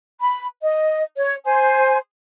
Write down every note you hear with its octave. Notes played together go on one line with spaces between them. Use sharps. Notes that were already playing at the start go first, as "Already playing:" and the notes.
B5
D#5
C#5
C5 G#5